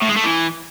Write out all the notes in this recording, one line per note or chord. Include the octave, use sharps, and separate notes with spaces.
A2
G#3
A3
E3